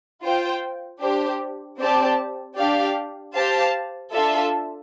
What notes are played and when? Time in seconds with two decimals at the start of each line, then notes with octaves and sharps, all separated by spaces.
0.23 F4 C5 G5
1.00 D4 G4 C5
1.79 C4 G4 D5 A5
2.56 D4 G4 D5 F5
3.34 G4 C5 F5 A5
4.13 D4 F4 A4 E5